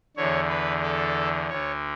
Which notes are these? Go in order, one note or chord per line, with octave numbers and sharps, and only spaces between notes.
E2 D3 C#5
B4
A4
D2 D3 C#5